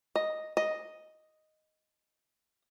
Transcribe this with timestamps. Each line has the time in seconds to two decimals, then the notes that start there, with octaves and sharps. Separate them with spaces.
0.16 D#5
0.57 D#5